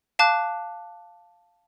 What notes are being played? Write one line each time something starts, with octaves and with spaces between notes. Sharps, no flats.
F5 A5 D6 F#6